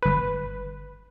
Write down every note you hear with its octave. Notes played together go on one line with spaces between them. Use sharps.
G1 B4